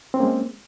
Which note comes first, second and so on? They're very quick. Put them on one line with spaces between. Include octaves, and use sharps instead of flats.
C4 C#4 A#3 G#3